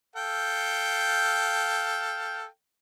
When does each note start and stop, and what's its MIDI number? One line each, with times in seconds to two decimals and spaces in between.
0.15 2.46 69
0.15 2.46 77
0.15 2.46 79